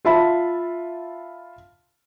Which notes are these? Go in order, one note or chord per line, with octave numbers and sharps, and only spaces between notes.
F4 E5 A5 B5